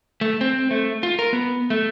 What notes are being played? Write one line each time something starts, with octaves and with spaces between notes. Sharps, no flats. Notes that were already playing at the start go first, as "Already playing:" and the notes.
A3
C4
A3
F4
A#4
B3
A3